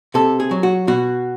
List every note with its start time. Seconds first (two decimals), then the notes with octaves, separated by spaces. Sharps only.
0.14 C3 A4
0.40 G#4
0.51 F#3
0.63 F#4
0.87 B2 F#4